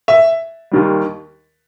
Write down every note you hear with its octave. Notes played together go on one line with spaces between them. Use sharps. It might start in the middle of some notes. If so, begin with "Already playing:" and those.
E5
D#2 D#3 G3